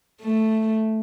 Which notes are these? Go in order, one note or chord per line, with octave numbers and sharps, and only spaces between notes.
A3